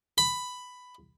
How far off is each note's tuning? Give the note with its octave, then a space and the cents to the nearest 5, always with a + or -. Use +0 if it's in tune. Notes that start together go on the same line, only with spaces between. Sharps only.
B5 +10